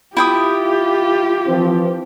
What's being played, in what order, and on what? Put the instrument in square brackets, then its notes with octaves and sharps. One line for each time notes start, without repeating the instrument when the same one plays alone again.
[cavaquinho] E4 G5 D#6 [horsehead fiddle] F4 G4
[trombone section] E3 C4 [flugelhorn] F3